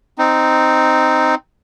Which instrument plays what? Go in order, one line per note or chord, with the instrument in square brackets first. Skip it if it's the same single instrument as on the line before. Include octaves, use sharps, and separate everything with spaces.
[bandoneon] C4 D#4